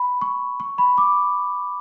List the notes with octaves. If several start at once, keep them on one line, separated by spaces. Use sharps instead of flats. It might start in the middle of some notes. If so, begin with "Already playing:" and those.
Already playing: B5
C#6
C#6
B5
D6